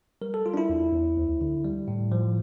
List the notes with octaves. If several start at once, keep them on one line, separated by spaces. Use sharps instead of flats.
G3 A#4
A4
G3 F4
D4
E4
E2
E2
D2
D3
G3
A2
F3